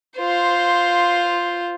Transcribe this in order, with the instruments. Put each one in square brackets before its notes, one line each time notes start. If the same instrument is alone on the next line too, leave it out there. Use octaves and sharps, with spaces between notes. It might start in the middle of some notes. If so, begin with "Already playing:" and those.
[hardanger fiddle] F4 C5